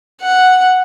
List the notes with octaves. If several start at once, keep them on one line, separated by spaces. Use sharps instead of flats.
F#5